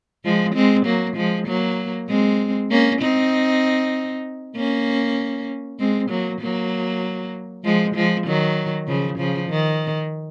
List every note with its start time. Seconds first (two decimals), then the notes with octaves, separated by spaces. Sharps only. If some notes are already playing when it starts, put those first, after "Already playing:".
0.24 F3 G#3
0.55 G#3 C4
0.85 F#3 A#3
1.16 F3 G#3
1.47 F#3 A#3
2.08 G#3 C4
2.71 A#3 C#4
3.01 C4 D#4
4.56 A#3 C#4
5.79 G#3 C4
6.10 F#3 A#3
6.41 F#3 A#3
7.64 F3 G#3
7.95 F3 G#3
8.26 D#3 F#3
8.87 C#3 F3
9.18 C#3 F3
9.49 D#3